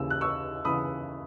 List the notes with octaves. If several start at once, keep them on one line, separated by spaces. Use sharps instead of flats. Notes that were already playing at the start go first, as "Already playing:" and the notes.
Already playing: D#2 C#3 E3 E6
F#6
C#6 E6
C#3 E3 B5 D#6